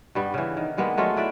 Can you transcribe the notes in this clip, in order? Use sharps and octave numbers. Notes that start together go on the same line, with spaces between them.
G2 G3 B3
C#3 E3
D#3
G3 G#3 A#3 B3
F#3 G#3 A3 F4
D4 E4 D5 E5